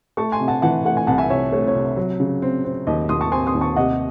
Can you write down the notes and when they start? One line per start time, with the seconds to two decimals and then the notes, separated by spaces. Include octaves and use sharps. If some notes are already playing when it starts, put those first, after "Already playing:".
0.17 A3 A5 C#6
0.32 G#5 C6
0.40 C3
0.48 F#5 A5
0.62 E3 F#5 A5
0.85 A3 F#5
0.97 G#5
1.07 C2 F#5 A5
1.18 E5 G#5
1.30 C3 C#5 E5
1.52 A3 C#5
1.67 C#5
1.75 C3
1.97 F#3
2.20 C#3
2.42 C4
2.65 C4
2.87 D#2 D#5
3.09 D#2 C6 D#6
3.21 A5 C#6
3.32 C4 G#5 C6
3.47 C6 D#6
3.54 D#2
3.61 A5 C#6
3.76 C3 D#5 F#5